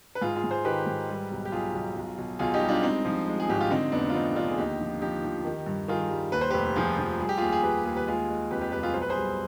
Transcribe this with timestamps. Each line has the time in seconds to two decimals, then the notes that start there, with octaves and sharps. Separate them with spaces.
0.15 B4
0.21 G#2 F4 G#4
0.36 F4 G#4
0.44 G#2
0.50 G#4 C5
0.65 D#3 G4 B4
0.86 G#2
1.09 G3
1.31 B1
1.45 G4
1.52 B1 F4 G#4
1.74 B1
1.97 B1
2.18 B1
2.39 B1 F4 G#4
2.54 D#4 G4
2.62 G3
2.68 D4 F4
2.83 G#3 C4 D#4
3.05 F3
3.28 G#3
3.40 G#4
3.49 G#1 G4
3.61 F4
3.70 D3 C4 D#4
3.92 F1 B3 D4
4.10 F4
4.14 F2 C4 D#4
4.36 D3 D4 F4
4.48 G#4
4.58 D#2 D#4 G4
4.80 F3
5.01 F3 D#4 G4
5.23 F3
5.45 D#3
5.66 G2
5.88 D#3 F4 G#4
6.10 G3
6.32 D#2 B4
6.41 C5
6.50 F1 G4 B4
6.76 F3 F4 G#4
6.98 F3
7.20 G3 G#4
7.29 G4
7.38 D#2 F4 G#4
7.52 G#4
7.63 D#2 G4 B4
7.85 D#2 G#4
7.97 B4
8.06 G#3 F4 G#4
8.28 G#3
8.51 F2 G4 B4
8.61 G4 B4
8.72 F1 G4 B4
8.83 F4 G#4
8.94 B1 C5
9.02 B4
9.09 G#4 C5
9.16 G3